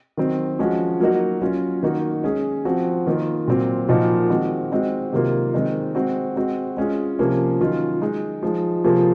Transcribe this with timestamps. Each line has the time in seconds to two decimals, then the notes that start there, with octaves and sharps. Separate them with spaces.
0.17 D#3 F#3 C4
0.59 F3 G#3 C#4 F#4
1.00 F#3 A#3 D#4 F#4
1.42 F#3 C#4 F4
1.83 D#3 A#3 D#4 F#4
2.23 G#3 C#4 G#4
2.65 F3 C4 F#4
3.07 D#3 A#3 F4
3.48 A#2 F#3 C4
3.88 A#2 F3 A#3 D#4 F#4
4.30 D#3 G#3 C4 F#4
4.72 G#3 C4 D#4 F#4
5.13 C3 D#3 F#3 A#3 F4
5.54 D#3 G#3 C4 D#4
5.95 G#3 C4 F#4
6.36 G#3 C4 F#4
6.77 G#3 C#4 F4 G#4
7.19 C3 F3 A#3 C#4
7.61 D#3 F#3 C#4 F4
8.01 G#3 D#4 G#4
8.43 F3 G#3 D#4 G#4
8.84 C3 F3 A#3 F4 G#4